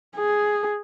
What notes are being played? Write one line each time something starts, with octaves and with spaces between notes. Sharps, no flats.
G#4